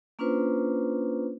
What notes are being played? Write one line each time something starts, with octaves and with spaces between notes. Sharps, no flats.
A#3 C#4 D4 F4 B4 C5